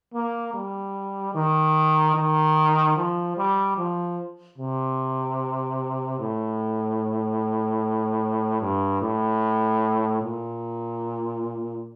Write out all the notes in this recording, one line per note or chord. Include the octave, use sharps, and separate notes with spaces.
A#3
G3
D#3
D#3
F3
G3
F3
C3
A2
G2
A2
A#2